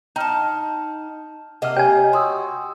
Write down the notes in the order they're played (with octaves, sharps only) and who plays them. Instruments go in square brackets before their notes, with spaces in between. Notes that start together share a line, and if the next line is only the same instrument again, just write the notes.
[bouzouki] D#4 A5 [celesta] G5 F6
[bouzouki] C3 A#3 D#5 [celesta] F#5 F6
[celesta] G4 C#5 [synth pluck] G5 G#5
[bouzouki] F#4 [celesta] C6 D#6 E6